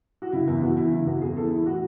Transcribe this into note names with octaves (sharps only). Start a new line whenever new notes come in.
F#4
C#3 E4
E2 E4
E2 F#4
E3 E4
C#3 E4
E2 F#4
E2 G#4
E3 A4
E3 E4
A2 F#4